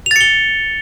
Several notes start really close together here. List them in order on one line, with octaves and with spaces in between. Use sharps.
F7 A6 C#7 G7